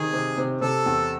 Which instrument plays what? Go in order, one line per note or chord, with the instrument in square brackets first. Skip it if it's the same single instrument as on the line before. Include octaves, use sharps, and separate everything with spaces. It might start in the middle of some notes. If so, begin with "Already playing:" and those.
Already playing: [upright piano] C3 D#3 [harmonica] G#4
[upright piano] C3
C3
[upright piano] C3 [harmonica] A4
[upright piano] E2